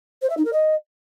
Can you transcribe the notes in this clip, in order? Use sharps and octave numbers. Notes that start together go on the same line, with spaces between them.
C5
E5
D#4
A#4
D#5